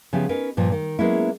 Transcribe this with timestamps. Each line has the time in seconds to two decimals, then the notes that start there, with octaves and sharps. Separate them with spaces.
0.13 C#3 F3 B3 E4 G4
0.29 C#4 D#4 A#4 B4
0.57 G2 A#2 F3
0.72 D#3
0.99 F#3 G#3 A#3 B3 C#4 E4